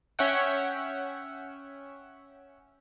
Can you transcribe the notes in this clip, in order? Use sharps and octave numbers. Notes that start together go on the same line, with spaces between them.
C#4 C#5 E5 F#5 G5